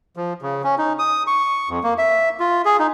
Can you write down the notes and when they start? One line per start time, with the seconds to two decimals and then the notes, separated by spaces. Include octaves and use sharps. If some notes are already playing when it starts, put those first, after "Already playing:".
0.16 F3
0.42 C#3
0.64 C#4
0.78 D#4
0.99 D#6
1.27 C#6
1.69 F2
1.84 A#3
1.98 E5
2.40 F4
2.65 G#4
2.79 D#4